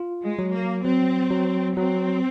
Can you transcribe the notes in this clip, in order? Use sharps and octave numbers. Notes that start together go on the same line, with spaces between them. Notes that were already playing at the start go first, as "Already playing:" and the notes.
Already playing: F4
G#3
F#3
A#3
F#3 C4
F#3
F#3 C4